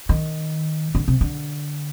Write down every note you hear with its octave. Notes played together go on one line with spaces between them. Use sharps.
D#3
D3
C3
D3